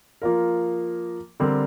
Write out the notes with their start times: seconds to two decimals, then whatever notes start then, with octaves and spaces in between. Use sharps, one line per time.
0.22 F3 A#3 F4 A#4
1.40 D3 G3 C4 A#4